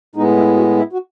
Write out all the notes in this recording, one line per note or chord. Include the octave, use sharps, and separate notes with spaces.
A2 G#3 B3 D#4
E4
F#4
E4
F#4